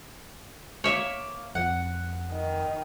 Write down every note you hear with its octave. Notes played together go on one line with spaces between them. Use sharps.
A#3 C#5 E5
F2 F#5
D#3